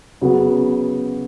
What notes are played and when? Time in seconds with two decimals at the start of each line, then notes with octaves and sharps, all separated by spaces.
0.21 C#3 F#3 B3